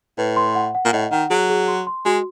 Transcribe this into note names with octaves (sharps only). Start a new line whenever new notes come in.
A2 B4
C6
F#5
F#5
A#2
A2 D#5
D#3 F#5
F#3 G#4
G#4
C6
C6
G#3 F#4